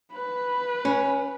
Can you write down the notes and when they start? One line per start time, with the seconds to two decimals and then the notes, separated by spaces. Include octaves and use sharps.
0.13 B4
0.85 C#4